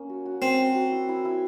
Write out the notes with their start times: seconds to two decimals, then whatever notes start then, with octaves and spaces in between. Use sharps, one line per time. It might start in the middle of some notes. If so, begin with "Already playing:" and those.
Already playing: A#3 C#4
0.09 F#4
0.26 F#4
0.42 A#3 C4
0.59 F#4
0.75 F#4
0.92 E4
1.09 E4
1.25 E4